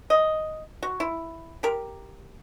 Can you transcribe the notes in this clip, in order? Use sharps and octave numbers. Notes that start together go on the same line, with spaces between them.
D#5
F#4
E4
G4 A#4